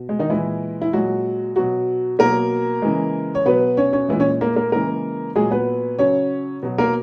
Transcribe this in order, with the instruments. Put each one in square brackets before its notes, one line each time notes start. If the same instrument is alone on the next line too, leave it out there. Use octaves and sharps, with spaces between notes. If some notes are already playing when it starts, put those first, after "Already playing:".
Already playing: [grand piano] B2
G#3
D#3 D#4
A#2 E3 G#3 E4
E4
A#2 F#3 G#3 F#4
B2 F#3 F#4
B2 F#3 A#3 A#4
C#3 E3 G#3
C#5
B2 F#3 B3 B4
C#4 C#5
C#4 C#5
A#2 E3 G#3 E4
C#4 C#5
A#3 A#4
A#3 A#4
C#3 E3 G#3 A#3 A#4
A#2 F#3 G#3 G#4
B3 B4
C#3 F#3 C#4 C#5
B2 F#3
A#3 A#4